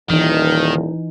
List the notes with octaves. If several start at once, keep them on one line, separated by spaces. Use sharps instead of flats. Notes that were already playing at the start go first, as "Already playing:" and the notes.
D#1 D#3 E3 D#4